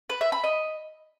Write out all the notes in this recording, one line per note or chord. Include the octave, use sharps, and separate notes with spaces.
B4
E5
B5
D#5